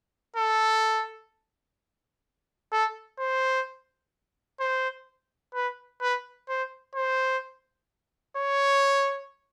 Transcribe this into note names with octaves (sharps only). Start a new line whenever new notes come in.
A4
A4
C5
C5
B4
B4
C5
C5
C#5